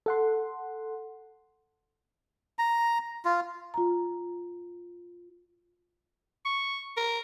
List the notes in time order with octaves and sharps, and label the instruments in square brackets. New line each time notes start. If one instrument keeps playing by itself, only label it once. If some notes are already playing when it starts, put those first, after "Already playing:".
[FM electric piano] A4 F#5 C6
[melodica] A#5
F4
[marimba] F4 A#5
[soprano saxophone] C#6
A#4